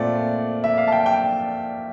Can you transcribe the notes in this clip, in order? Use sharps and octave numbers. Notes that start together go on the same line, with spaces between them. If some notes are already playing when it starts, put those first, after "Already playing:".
Already playing: A#2 A3 C4 D5
E5
F5
A5
G5
G5